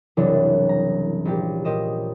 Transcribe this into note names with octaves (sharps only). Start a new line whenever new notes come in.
F#1 C2 E3 F#3 D4 C#5
A#5
A#1 G4
A#2 G4 D#5 E7